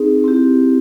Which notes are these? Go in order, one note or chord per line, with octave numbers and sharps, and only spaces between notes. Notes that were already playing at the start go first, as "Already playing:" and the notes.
Already playing: C4 D#4 G#4
C4 E4 G4